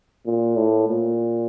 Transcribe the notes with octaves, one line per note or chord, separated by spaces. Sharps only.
A#2
A2
A#2